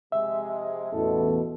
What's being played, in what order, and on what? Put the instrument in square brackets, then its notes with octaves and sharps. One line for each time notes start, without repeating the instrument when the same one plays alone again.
[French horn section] C3 F3 G#3 [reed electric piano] E5
[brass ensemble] A1 E2 B2 [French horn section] A4